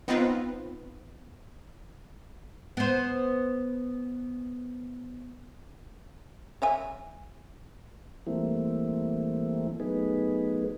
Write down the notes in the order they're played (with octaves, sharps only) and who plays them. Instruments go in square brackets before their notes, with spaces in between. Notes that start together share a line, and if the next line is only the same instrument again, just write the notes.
[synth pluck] B3 C4 D#4 F4 B4
[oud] B3 C5
[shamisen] C#5 E5 G#5
[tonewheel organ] E3 G3 A3 A#3 C4 E4
F#3 A3 B3 D#4 G#4 B4